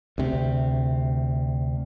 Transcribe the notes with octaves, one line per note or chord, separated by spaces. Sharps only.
D2 C3